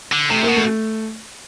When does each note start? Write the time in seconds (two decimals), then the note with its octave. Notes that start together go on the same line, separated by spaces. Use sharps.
0.12 D3
0.30 C3 A3
0.43 A#3
0.49 B2
0.56 A3